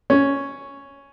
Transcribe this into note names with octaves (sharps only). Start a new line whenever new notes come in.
C#4